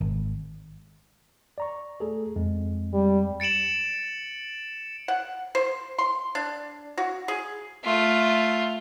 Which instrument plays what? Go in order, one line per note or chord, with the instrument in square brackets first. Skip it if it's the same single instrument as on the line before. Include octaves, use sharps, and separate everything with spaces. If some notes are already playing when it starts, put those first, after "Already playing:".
[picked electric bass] G#1
[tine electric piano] D5 A#5 C#6
A3 G#4 A4
F2 G#3 C4
[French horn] G3
[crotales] A6 C#7 D7 E7 F#7
[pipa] F#5
C5
C6
D4
F#4
G#4
[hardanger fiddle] A3 F4